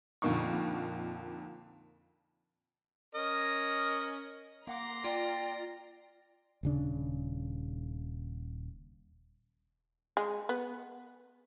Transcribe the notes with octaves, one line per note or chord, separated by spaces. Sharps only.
F2 A#2 D3 A#3 D#4 C#6
C#4 A#4 D#5
A#3 F#5 A#5 C6 D6 A#6
F4 D5 G5
D#1 C#3 D4
G#3
B3